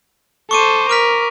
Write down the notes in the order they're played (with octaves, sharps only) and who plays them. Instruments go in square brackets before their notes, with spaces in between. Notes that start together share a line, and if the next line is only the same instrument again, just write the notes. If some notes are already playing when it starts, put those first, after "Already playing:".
[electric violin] A4 C5 [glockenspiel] C#6 D6 D#7
[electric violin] A#4 [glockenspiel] D6 F6 B6